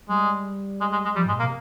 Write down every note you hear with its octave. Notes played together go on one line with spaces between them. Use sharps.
G3 G#3
G#3
G#3
G#3
F3 G3
G#2 G#3
A#2
A#3
C3